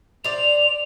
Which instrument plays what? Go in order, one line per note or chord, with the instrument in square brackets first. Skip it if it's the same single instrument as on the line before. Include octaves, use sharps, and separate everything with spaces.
[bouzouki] C5 D5 [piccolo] F7